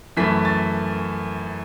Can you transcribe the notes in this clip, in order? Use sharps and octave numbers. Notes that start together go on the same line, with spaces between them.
F#2 E3 A3 B6
A6